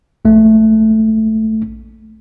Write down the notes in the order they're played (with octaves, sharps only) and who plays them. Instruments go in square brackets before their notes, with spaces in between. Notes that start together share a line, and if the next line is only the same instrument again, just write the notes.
[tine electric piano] A#1 A3